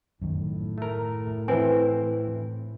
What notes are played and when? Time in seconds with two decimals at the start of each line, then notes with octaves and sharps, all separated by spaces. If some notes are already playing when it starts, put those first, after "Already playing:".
0.22 F#2 A2 D#3
0.78 A3 A#4
1.48 E3 C4 B4 G#5